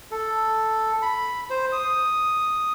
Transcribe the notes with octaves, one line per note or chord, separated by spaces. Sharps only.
A4
B5
C5
D#6